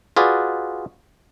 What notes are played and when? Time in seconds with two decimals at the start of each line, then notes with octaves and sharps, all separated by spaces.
0.17 F4 F#4 G#4 B4 D5